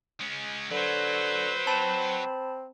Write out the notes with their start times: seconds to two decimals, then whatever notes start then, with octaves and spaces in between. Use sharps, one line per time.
0.21 G#3 C#4
0.71 D3 F#3 B4 C5
1.67 C4 A5 B5